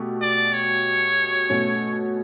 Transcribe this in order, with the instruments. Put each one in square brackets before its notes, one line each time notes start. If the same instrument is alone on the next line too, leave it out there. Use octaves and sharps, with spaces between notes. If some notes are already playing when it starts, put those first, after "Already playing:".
Already playing: [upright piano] B2 A3 G4
[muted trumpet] D5
C#5
[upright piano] B2 A3 C#4